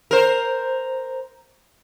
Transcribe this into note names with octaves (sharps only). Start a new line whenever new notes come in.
A#4 C5